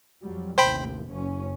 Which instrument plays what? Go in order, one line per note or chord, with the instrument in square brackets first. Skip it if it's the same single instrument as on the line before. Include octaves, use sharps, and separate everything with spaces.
[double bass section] F2 F#3 G3
[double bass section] A1 D#2 C3 [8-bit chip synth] C5 G5 B5
[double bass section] F#1 F#2 C#4